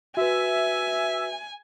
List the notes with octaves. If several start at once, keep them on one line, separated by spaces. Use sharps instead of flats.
F#4 B4 E5 G#5